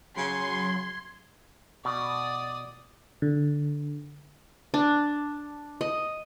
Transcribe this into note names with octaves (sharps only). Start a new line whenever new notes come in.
C#3 F#3 C6 G#6
B2 D5 D#6
D3
D4
D#5